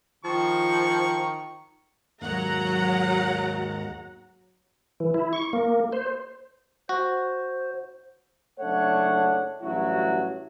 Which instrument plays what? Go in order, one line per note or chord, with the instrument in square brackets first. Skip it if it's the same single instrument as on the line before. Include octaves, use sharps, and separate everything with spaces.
[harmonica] D#3 C#6 [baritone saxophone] F3
[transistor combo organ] D#2 G#2 A#3 [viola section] F#3 F#5 A#5
[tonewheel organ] E3
E4
C#6
A#3
C5
[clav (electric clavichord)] F#4 [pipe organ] C5
[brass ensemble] F#1 A3 D4 C#5 F#5
A1 G2 F#3 E4 F#4